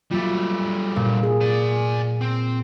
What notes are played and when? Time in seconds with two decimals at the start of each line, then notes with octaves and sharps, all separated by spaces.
0.11 F#3 G3 A3 A#3 F4
0.96 A#2 A#3
1.23 G#4
1.41 D5 G#5
2.21 C4